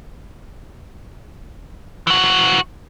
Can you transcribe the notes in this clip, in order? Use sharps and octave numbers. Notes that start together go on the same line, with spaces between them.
E3 F#4